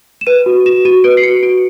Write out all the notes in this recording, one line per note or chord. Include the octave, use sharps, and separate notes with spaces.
E7
B4 D#7
F#4
F#4 E7
F#4 D#7
B4 D7
C7
F#4 C#7
F#4 D7